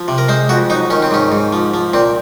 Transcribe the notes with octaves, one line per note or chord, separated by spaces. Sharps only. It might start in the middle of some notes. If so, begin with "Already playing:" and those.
Already playing: F3
C3
A#4
G#3 C5
F2 F#4
F#3 D#4
D#3 C#4
C4
G#2 C#4
G#2
F3
F3
A#2 C4